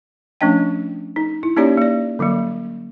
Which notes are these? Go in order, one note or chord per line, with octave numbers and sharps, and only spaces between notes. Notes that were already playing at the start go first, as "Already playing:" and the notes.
F3 A3 C#4 D4 D#5 G5
D#4
E4
A#3 C#4 D#4 G4 C#5 D5
A#3 D5
D3 F#3 G3 A#3